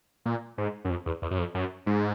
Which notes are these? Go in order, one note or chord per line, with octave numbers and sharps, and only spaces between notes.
A#2
G#2
F#2
F2
E2
E2
F#2
F2
F#2
G#2